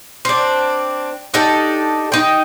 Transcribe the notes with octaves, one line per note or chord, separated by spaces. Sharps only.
C4 D4
D4 D#4 G4 A4
D#4 G5